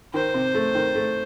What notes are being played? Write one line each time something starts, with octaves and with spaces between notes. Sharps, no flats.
D#3 C5
C3
A3
D#3
A3